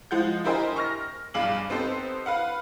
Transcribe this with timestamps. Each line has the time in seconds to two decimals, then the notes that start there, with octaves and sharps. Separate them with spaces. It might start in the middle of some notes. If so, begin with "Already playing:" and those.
0.11 F3 G#3 F#5 G6
0.44 E4 G4 A#4 C5 D#5 G#5
0.76 C#6 F6 A#6
1.34 B1 G2 G#4 F5 D6 F#7
1.70 B3 C4 D#4 G4 A4 C5
2.26 B4 F5 F#5